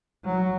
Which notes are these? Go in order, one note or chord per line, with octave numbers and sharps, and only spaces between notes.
F#3